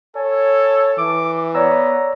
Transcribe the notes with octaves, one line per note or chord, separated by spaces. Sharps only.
A4 C#5 G#5
E3 D6
B3 C#5 D5 A#5 E6